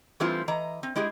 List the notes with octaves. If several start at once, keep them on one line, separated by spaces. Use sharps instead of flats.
E3 G3 A3 C4 E4 F4
E3 D#5 A#5
C4
G#3 E4 G4 G#4